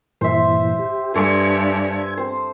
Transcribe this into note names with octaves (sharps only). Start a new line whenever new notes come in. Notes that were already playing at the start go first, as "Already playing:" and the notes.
G2 A#2 E3 C5 E5
G4
G2 A4 C5 G#5
C4 C5